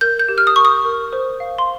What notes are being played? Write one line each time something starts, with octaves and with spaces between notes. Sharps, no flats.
A#4 G6
G6
G4
F6
D#6
A#4 C#6
D#6
A#4
C5
F5
C6